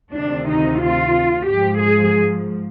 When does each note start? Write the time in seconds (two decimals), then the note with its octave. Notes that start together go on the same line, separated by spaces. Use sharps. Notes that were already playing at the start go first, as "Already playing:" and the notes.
0.14 D2 C3 D#3 D4
0.46 D#4
0.80 F4
1.47 G#2 F3 G4
1.80 G#4